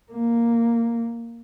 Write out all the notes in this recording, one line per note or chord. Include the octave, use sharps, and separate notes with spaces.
A#3